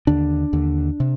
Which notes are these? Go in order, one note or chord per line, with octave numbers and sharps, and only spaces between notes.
D#2 D3 D4
D#2 D3
C3